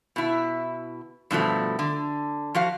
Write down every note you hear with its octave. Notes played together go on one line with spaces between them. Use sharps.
B2 E4
G2 B2 F3 A3
D3
F3 F#4 F5